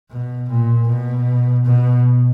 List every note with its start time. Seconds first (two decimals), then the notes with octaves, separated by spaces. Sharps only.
0.10 B2
0.49 A#2
0.87 B2
1.65 B2